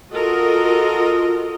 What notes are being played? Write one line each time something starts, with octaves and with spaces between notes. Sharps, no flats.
F4 F#4 A4 A#4 D#5